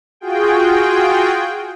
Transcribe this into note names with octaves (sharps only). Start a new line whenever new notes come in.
F4 F#4 G#4 G5